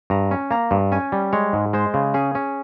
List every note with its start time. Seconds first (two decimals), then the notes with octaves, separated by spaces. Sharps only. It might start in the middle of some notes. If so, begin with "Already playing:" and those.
0.10 G2 A#5
0.31 C#4
0.51 A#3 A#5
0.71 G2
0.92 C#4 G#5
1.12 G3
1.33 G#3 C#5
1.53 G#2
1.73 G#3 C5
1.94 C#3
2.14 C#4 G#4
2.35 C#4